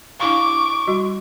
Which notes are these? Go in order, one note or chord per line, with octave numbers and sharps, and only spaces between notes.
D4 E4 F5 C#6 D6
G3 F#4